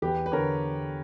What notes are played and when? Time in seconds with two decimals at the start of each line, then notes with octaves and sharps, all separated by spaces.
0.02 E2 G4 B4
0.26 B4
0.32 D3 A#4 C#5